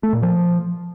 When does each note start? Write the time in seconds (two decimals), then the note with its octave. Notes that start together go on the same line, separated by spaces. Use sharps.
0.03 A3
0.13 A#2
0.23 F3